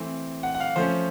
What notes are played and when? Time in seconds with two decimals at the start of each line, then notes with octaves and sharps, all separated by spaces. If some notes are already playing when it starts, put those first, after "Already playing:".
Already playing: E3 A3 C4
0.43 F#5
0.55 F#5
0.60 F5
0.76 F3 A3 C#4 C5